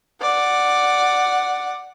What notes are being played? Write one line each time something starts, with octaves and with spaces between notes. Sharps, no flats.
D5 F#5